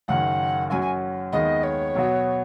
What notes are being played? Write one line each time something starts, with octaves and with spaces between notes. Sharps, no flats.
F#1 F#2 D#3 F#5
F#2 F#3 C#4 F#4 G#5
G#5
D#2 D#3 G#3 B3 D#5
C#5
B2 F#3 B3 F#4